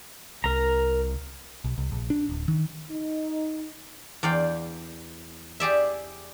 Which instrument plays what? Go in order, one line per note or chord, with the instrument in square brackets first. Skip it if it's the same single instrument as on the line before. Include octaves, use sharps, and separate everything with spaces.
[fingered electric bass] C2 [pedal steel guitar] A#4 A#5
[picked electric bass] B1
C2
A#1
D4
D1
D#3
[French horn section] D#4
[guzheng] E2 D5 F5 G5
G4 G#4 D5 E5